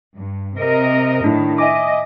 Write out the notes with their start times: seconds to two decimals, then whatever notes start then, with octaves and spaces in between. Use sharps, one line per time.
0.16 G2
0.58 C3 A#4 D#5
1.24 A2 D#3 D4 E4
1.58 D#5 E5 G#5 D6